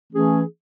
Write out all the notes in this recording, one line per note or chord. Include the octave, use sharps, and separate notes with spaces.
E3 A3 C#4 G#4